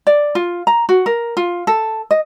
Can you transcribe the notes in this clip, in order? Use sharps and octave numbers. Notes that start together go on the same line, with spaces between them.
D5
F4
A#5
F#4
A#4
F4
A4
D#5